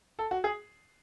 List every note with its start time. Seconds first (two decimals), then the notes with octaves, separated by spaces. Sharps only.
0.19 A4
0.31 F#4
0.44 G#4